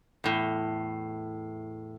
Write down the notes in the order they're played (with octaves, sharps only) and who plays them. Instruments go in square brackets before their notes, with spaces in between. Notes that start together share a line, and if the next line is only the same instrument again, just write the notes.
[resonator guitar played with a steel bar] E2 A2